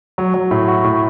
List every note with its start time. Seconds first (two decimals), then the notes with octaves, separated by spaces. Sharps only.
0.18 F#3
0.34 F#3
0.51 A2
0.68 F#4
0.84 A2